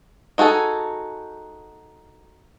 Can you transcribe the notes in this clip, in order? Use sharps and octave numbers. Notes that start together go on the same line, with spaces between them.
D#4 F#4 G#4 A4